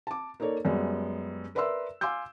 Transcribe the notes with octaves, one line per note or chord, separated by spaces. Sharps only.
A5 D6
A#3 D#4 A4 C#5 D5
F#2 G3 G#3 B3
A#4 B4 D5 E5 C6 E6
F5 G#5 C6 D6 E6 G6